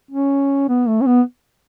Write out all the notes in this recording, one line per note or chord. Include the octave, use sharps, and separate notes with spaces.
C#4
B3
A3
C#4
B3